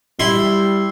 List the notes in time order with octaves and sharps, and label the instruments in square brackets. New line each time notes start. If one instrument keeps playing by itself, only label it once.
[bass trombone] G3 [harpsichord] E4 C6